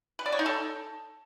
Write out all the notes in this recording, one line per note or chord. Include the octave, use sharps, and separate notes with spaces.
B4
D5
C#5
D#4
A4